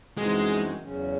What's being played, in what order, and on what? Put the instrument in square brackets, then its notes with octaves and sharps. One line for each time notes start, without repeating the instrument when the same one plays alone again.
[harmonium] F#2 E3 C4 D#4 F#4 [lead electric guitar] G#3
[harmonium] E2 C#3 F#3 C#4